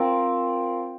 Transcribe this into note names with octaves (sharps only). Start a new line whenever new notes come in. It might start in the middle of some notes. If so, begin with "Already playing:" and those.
Already playing: C4 F4 A#4